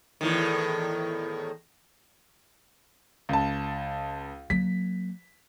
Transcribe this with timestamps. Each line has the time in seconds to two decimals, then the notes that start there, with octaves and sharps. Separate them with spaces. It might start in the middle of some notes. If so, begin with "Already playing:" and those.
0.21 E2 A2 D#3
3.29 C#2 A5
4.50 F#3 A#3 B6